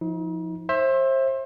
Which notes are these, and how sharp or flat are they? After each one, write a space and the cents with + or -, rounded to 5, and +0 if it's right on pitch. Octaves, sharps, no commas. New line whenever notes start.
F3 +0 D#4 +40
C5 +30 E5 +0